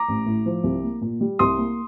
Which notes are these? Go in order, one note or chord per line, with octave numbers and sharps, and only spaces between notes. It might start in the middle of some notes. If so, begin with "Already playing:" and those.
Already playing: A#5 D6
A1
A2
F3
C2
A#3
A#2
G3
C2 C6 D#6
A#3